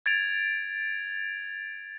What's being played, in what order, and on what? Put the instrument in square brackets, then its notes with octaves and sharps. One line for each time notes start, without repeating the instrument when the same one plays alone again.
[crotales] G#6 A6 D7 F7